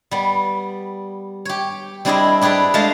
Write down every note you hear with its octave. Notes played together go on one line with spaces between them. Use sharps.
G3 B3
G4 C#5
G3 C4 D4 E4 G#4 D#5
D4 G4 G#4 B4 D5
G#3 A3 F5 A5